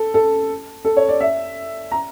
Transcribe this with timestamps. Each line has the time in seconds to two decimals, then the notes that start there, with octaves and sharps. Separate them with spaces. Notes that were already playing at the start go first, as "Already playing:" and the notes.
Already playing: A4
0.14 A4
0.85 A4
0.97 C#5
1.09 D5
1.20 E5
1.91 A#5